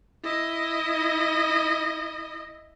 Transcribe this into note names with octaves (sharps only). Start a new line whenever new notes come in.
E4 D#5